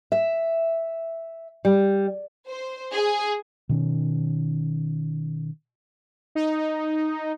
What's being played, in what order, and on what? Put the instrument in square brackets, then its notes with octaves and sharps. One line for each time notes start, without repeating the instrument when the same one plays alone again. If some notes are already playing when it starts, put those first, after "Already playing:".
[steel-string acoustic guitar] E5
G3
[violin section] C5
G#4
[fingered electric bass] B2 D#3 C#4
[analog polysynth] D#4